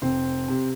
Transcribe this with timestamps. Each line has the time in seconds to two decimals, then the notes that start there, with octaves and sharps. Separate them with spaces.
0.02 F1 C4
0.48 C3